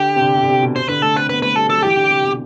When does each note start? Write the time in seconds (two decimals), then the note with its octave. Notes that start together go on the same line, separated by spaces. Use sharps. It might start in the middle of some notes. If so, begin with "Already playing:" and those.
Already playing: D3 G4
0.16 C3
0.21 D3
0.36 C3
0.43 D3
0.48 C3
0.62 B2
0.76 C3 C5
0.89 D3 B4
1.02 A3 A4
1.16 C4 B4
1.29 B3 B4
1.42 A3 B4
1.56 G3 A4
1.70 F#3 A4
1.83 E3 G4
1.97 D3
2.10 C3
2.24 B2